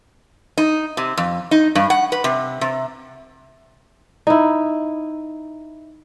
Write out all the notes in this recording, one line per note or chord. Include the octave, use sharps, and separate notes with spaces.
D#4
C3
F2
D#4
G2
F#5
B4
C3
C3
D#4 E4